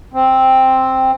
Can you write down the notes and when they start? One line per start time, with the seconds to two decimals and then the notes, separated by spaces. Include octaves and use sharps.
0.13 C4